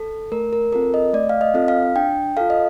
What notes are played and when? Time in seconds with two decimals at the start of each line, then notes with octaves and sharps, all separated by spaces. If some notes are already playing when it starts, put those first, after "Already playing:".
Already playing: A4
0.32 A3 A#4
0.53 A#4
0.72 C4 F4 A4 A#4
0.94 D#5
1.14 A3 D5
1.29 F5
1.41 D#5
1.54 C4 F4 A4
1.68 F5
1.96 D4 G5
2.37 F4 A4 F5
2.50 D#5